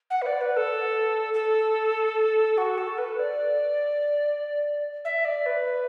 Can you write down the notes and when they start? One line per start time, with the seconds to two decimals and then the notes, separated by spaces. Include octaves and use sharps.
0.10 F#5
0.21 B4
0.26 D5
0.41 B4
0.56 A4
1.34 A4
2.57 F#4
2.77 A4
2.98 B4
3.19 D5
5.04 E5
5.25 D5
5.46 B4